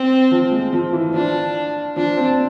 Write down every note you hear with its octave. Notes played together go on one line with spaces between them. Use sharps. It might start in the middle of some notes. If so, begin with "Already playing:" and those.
Already playing: C4
F3
G#3
F3
E3
F3 D4
F3 D4
C4